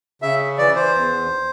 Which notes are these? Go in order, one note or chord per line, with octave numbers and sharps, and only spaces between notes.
C#3 E5
E3 D5
C5
E2